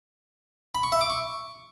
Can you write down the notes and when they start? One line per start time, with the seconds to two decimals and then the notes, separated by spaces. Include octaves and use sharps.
0.75 B5
0.83 C#6
0.92 E5
1.01 D6
1.10 C#6